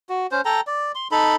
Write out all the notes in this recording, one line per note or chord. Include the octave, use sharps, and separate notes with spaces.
F#4
C#4 C5
A4 G5 A#5
D5
C6
D#4 A4 B5